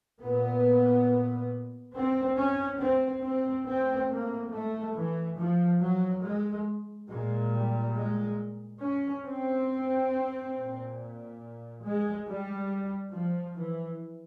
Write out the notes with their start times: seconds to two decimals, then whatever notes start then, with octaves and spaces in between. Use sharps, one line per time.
0.21 A#2 B3
1.94 C4
2.37 C#4
2.79 C4
3.23 C4
3.66 A2 C4
4.09 A#3
4.52 A3
4.95 E3
5.37 F3
5.81 F#3
6.24 G#3
7.10 A#2 G#3
7.53 G3
7.96 G#3
8.82 C#4
9.25 C4
10.55 A#2
11.84 G#3
12.27 G3
13.12 F3
13.56 E3